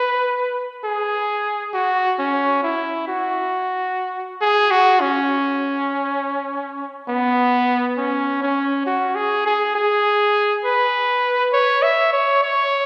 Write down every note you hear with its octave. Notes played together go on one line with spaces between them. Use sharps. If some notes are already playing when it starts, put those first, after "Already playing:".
Already playing: B4
G#4
F#4
C#4
E4
F#4
G#4
F#4
C#4
B3
C#4
C#4
F#4
G#4
G#4
G#4
B4
C#5
E5
C#5
C#5